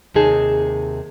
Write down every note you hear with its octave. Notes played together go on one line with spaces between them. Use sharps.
D#2 C3 D#4 G#4 A5